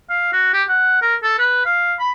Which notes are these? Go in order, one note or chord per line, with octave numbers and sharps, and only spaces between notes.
F5
F#4
G4
F#5
A#4
A4
B4
F5
B5